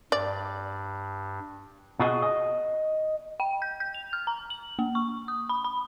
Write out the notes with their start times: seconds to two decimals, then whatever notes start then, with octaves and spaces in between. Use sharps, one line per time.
0.12 G2 D5
1.99 B2 F4 F#4 G#4 D5 D#5
2.22 D#5
3.40 G5
3.62 G6
3.80 G6
3.94 F7
4.13 F6
4.27 A#5
4.50 F#7
4.79 A#3
4.95 C#6
5.28 D#6
5.49 B5
5.64 B5